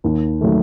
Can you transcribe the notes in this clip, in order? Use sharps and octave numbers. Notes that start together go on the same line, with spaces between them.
D#2
D#3 F#3 A3